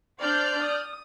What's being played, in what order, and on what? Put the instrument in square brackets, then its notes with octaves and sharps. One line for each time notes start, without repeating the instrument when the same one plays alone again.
[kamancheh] D4 C5 [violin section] D5 F6 G6
[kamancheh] D#6